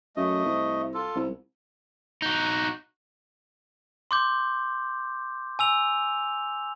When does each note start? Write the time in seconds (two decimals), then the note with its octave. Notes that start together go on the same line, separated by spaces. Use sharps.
0.16 F#2 A3 D#5
0.45 C2
0.94 F4 A4
1.15 C2
2.22 D#4 F#4
4.11 C6 D6 G6
5.59 G#5 E6 F7